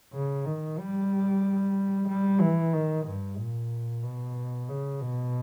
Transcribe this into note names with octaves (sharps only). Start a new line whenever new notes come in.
C#3
D#3
G3
G3
E3
D#3
G2
A#2
B2
C#3
B2